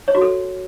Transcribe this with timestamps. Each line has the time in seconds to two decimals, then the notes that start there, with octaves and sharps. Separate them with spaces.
0.08 C#5
0.15 F#4
0.21 A4